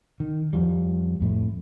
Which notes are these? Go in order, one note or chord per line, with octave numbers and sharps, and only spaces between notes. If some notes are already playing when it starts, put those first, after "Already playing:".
D#3
F2 F3 G3
F2 A2 A3